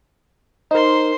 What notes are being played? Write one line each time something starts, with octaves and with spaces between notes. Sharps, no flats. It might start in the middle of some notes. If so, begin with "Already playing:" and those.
D#4 A#4 C5 C6